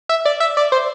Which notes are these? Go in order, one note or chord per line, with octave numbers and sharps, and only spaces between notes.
E5
D5
E5
D5
C5